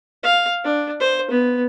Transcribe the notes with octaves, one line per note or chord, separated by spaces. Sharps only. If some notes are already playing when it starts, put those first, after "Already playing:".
F5
D4
C5
B3